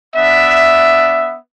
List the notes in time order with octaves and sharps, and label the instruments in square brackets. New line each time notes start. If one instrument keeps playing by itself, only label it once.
[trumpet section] B3 D4 E5